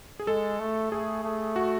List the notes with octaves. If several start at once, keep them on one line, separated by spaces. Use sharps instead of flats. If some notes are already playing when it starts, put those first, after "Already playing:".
G#4
G#3 A4
A3
A3 G#4
A3
F#4